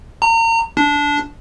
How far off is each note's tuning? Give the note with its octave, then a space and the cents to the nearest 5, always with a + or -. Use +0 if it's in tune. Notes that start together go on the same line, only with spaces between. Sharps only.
A#5 -35
D4 -15